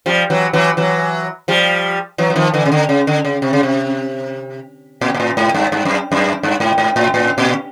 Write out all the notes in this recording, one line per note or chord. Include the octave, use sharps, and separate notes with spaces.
F3 G3
E3 F#3
E3 F#3
E3 F#3
F3 G3
E3 F#3
F#3
D#3 F3
D3 E3
C#3
D3
C#3
D3
C#3
C3
C#3
C3
A#2
A#2
A2
G#2
G2
G2
F#2
F#2
G2
G#2
G#2
A2
A2
A#2